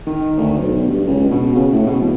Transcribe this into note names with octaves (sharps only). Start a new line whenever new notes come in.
D#3
D2
B1
G2
C#2
B2
C#3
A2
B2
D1